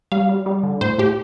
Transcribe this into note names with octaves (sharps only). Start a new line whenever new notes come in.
G3 F5
G3
G3
D3
A2 C5
A2 G4